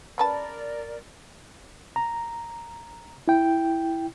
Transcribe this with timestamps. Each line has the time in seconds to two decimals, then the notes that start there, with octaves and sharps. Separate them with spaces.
0.18 C#3 A#4 B4 D5 A5
1.96 A#5
3.28 E4 G5